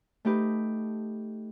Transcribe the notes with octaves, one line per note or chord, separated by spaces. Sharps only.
A3 D#4 G4 B4